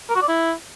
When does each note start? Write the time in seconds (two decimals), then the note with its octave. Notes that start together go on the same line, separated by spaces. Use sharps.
0.09 A#4
0.16 F#4
0.22 D5
0.28 E4